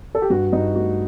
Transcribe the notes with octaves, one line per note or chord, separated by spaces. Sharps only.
A4
G4
G2 F#4
G2 D#4
A3 F#4